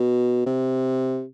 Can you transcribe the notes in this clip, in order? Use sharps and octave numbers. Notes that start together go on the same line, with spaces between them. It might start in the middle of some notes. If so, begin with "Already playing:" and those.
Already playing: B2
C3